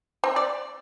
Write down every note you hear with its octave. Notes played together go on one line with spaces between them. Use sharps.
C4
D5